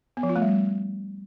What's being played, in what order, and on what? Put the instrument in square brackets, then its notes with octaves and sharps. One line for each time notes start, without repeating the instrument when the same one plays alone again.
[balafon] B3
F3
F4
A3
G3